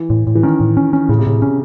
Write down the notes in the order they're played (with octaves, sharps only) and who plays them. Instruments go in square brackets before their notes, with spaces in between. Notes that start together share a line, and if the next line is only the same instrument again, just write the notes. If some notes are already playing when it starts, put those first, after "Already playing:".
Already playing: [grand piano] E3
[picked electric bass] A2
A2
[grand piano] E3
[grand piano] D#3 [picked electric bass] C#4
[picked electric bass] A2
C#4
C#4
[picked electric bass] A2 [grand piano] C#3
[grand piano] C3
[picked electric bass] A2 [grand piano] C#3
[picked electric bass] C#4